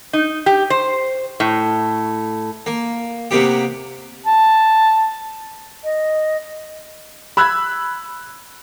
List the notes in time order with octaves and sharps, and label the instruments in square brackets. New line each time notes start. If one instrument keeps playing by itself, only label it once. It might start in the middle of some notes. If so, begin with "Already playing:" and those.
[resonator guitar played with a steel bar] D#4
G4
C5
A2
[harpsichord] A#3
C3 A#3 B3 G4
[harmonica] A5
[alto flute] D#5
[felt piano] B5 E6 F#6 G#6